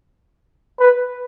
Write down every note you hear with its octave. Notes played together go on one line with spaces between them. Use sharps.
B4